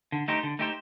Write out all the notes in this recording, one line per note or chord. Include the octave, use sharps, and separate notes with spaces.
D3
A3 D#4 G4 C5
D3
A3 D#4 G4 C5